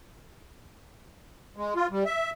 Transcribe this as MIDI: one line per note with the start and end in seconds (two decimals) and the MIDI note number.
1.57 1.74 56
1.75 1.87 65
1.91 2.04 55
2.05 2.31 76